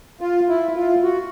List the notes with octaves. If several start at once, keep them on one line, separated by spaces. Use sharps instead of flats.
F4
E4
F4
F#4